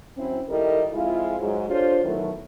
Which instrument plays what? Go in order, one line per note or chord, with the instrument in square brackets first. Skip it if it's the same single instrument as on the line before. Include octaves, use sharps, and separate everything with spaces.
[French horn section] F#3 C4 C#4 E4
D#3 G3 E4 A4 A#4 D#5
F2 G#3 E4 F4
G#2 F#3 G#3
D4 F4 G4 A4 C5 C#5
B2 D#3 E3 F#3 A3 A4